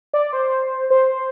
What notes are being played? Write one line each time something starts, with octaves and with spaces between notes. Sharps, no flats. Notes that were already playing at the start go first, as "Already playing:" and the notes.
D5
C5
C5